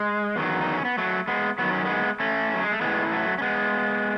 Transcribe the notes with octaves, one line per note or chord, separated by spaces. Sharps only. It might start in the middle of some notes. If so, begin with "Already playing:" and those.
Already playing: G#3
E2 D#3 F#3
D#4
C#4
B3
F#3 A3
G#3 B3
F#2 D#3 F#3 B3
C#4
G#3 B3
A3 C#4
F#3
G#3
A3
A2 E3 G#3 B3
F#3 A3
C#4
G#3 B3